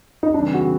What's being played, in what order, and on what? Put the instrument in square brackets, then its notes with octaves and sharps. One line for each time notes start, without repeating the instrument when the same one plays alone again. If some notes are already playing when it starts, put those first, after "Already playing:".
[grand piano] D#4
[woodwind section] C#3 E3 G3 C4 [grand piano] D4
[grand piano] F#4